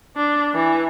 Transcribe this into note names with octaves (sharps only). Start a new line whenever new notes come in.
D4
E3